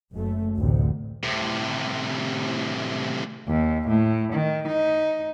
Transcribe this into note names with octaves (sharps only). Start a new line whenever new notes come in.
F#1 F#2 A3
A1 D2 C3
A2 C3
D#2
A2
D#3
D#4